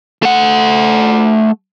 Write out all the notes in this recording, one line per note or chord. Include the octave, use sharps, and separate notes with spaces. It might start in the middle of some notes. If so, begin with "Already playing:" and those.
A3 F#5